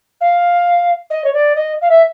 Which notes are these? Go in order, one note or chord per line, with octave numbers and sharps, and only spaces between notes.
F5
D#5
C#5
D5
D#5
F5
E5